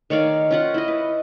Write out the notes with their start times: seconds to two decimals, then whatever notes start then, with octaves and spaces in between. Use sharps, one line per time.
0.10 D#3 C#5 D5 F5
0.51 C#4 F4 F#5
0.74 E4 D#5
0.88 B4